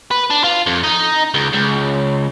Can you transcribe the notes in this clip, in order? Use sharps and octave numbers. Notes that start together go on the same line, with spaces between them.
B4
D4
F4
F2
D#4
C#2
C#2